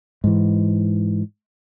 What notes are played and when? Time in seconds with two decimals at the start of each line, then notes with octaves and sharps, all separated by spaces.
0.24 G#2 E3